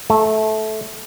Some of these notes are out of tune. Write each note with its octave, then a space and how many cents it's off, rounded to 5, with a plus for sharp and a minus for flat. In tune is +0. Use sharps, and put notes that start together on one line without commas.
A3 -15